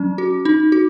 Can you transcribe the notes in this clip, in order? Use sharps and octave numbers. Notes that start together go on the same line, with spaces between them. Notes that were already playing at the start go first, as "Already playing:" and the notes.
Already playing: F#3 C#4
F#4
D#4
F#4